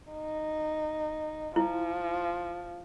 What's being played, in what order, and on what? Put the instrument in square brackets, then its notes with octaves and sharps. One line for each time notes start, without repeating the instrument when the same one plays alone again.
[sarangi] D#4
[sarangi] F3 [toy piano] E4